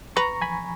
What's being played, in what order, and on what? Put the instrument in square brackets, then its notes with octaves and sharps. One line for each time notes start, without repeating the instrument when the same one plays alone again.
[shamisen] B4 [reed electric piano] A#5 C#6
[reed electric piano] G#5 B5